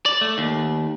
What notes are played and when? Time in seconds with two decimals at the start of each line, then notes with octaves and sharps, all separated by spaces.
0.06 D5
0.21 A3
0.38 D#2